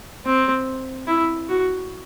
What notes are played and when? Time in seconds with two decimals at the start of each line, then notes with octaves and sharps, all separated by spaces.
0.25 C4
1.07 E4
1.49 F#4